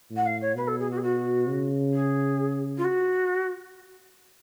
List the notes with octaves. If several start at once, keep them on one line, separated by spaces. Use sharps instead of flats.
A2
F#5
F5
C#5
B2 B4
A4
G#4
F#4
G#4
F#4
C#3
G#4
F4
F#4